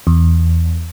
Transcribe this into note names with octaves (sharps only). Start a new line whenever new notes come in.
E2